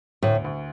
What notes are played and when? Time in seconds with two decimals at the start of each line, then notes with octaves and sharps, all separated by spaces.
0.22 D2 A2
0.44 D2